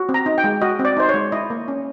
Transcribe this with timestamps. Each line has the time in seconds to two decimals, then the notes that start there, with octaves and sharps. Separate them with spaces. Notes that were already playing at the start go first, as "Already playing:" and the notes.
Already playing: F#4
0.09 C4
0.14 A#5
0.26 D#4
0.38 G5
0.44 G#3
0.62 F#4 D#5
0.79 C4
0.85 D5
0.97 D#4 C5
1.09 G#3 C#5
1.32 E4 D#5
1.50 A#3
1.68 C#4